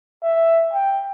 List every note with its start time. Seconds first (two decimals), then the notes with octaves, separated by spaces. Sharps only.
0.22 E5
0.73 G5